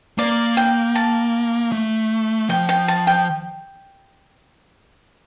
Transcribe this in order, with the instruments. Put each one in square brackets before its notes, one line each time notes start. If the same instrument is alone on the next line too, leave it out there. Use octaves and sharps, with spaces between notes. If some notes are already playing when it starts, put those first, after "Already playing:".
[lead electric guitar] A#3 [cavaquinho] D5
[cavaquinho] G5
A5
[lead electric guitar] A3
[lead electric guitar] F3 [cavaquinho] G5
[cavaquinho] G5
A5
G5